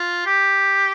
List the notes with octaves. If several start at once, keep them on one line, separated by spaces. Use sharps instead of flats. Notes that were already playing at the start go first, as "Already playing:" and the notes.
Already playing: F4
G4